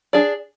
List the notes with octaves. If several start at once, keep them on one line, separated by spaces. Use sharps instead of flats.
D4 G#4 D5